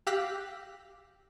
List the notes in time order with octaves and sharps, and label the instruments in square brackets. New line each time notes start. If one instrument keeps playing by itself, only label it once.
[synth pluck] G4 F5 E6 F#6 A#6 B6